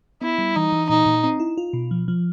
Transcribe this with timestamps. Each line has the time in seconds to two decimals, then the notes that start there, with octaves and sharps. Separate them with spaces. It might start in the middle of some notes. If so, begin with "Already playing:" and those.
0.22 B3 E4
0.38 G3
0.56 E3 D#4
0.72 E3
0.89 A#2 D#4
1.06 A#2
1.24 C4
1.40 E4
1.57 F4
1.73 B2
1.91 F3
2.08 F3